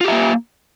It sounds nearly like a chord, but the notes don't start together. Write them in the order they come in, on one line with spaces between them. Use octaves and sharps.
F4 G4 E5 A#3